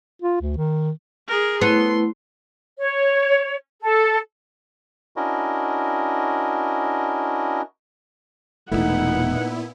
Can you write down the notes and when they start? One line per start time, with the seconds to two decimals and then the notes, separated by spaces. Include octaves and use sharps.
0.22 F4
0.41 D2
0.57 D#3
1.28 G#4 A#4
1.61 A3 B3 E4 C6
2.80 C#5
3.81 A4
5.16 C#4 D4 E4 F#4 A#4 D#5
8.71 E1 D#2 A#2 A3 B3 D#4 E4 F#5